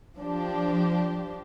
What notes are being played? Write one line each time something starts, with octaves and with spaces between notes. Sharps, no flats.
F3 D4 G4